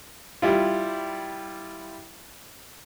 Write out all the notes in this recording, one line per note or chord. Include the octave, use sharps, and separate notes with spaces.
G3 E4 F4